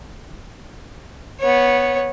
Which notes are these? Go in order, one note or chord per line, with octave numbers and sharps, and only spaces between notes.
B3 C#5